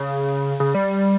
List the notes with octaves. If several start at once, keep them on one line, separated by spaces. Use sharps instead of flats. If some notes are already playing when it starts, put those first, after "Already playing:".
Already playing: C#3
C#3
G3